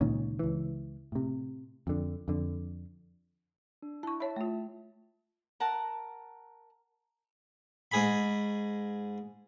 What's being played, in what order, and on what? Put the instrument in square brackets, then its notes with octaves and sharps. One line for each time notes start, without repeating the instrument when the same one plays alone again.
[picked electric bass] C#2 A#2 D#3 C#4
C#2 E3
A2 C3
F2 D3
F2 D3
[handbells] D4
[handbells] E4 [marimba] A5 C#6
[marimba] C#5 B5 [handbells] E5 A5
[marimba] A3 F4
[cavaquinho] A#4 F#5 A5 A#5
[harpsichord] G#2 G#4 B5